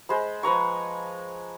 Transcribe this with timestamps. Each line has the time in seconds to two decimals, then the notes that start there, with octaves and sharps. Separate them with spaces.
0.09 G#3 C5 B5
0.43 F3 B4 A#5 C#6